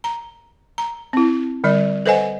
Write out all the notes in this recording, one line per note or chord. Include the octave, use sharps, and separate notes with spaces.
A#5
A#5
C4 E4
D3 G3 D5
A4 B4 C5 D#5 F#5 G#5